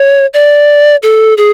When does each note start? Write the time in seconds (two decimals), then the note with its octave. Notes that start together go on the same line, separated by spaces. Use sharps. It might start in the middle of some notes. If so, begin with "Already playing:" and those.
Already playing: C#5
0.34 D5
1.03 A4
1.37 G#4